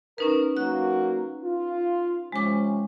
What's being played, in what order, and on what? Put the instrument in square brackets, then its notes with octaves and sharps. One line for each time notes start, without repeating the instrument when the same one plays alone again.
[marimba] C#4 D#4 B4 [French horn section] A#4
[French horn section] F#3 A#3 F#4 [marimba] F#6
[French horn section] F4
[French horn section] C3 F3 C#4 [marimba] G#3 D6